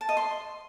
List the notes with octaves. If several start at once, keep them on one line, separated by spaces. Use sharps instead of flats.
A5
D#5
C6